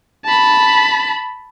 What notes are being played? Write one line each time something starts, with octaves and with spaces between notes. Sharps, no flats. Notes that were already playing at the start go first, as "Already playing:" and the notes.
A5 B5